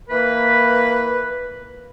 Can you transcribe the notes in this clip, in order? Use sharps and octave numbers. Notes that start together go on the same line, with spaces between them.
E3 A#3 A#4 B4